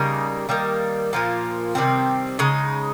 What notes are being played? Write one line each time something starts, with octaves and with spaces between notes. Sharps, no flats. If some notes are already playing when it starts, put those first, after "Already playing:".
Already playing: C#3 G3 A#3 D#4
D#3 G3 A#3
A#2 F3 A#3 F4
C3 D#3 G3 C4
C#3 G#3 D#4